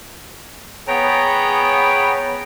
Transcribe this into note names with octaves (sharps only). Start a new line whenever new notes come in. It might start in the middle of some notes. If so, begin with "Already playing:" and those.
B3 G#4 C#5 G5 A#5